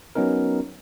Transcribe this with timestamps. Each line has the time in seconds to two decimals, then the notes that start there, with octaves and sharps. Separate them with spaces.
0.15 F#3 B3 C#4 D#4 A#4